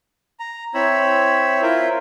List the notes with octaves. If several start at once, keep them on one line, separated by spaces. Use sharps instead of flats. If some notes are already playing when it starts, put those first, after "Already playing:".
A#5
C4 E4 C#5 B5 E6
E4 F4 A#4 C5 E5